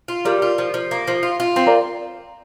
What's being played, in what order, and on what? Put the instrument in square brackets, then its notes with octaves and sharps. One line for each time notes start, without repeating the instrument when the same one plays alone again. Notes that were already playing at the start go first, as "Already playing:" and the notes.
[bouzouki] F4
[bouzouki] G3 [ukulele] A#4 D5
[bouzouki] F4
F3
F3
A#3
F3
F4
F4
[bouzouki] C4 [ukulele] C5
[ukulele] A#4 D5